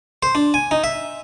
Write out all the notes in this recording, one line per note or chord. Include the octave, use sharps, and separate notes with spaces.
C5
D4
G#5
D#4
E5